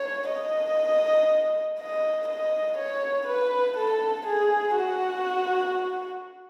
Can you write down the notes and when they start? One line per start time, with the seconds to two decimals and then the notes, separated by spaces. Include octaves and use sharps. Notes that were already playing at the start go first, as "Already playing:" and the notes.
Already playing: C#5
0.30 D#5
1.79 D#5
2.28 D#5
2.78 C#5
3.28 B4
3.77 A4
4.27 G#4
4.76 F#4